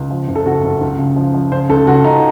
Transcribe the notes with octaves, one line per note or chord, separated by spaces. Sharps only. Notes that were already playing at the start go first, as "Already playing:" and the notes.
Already playing: C#2
F3
F#1
A4
F#1 F#4
F#1
C#2
C#3
F3
F3
C#3 C5
C#2 A4
C#2 F#4
C#3 D#4